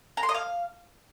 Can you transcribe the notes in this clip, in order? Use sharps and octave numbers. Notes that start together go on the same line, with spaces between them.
A#5
C6
D#5
F5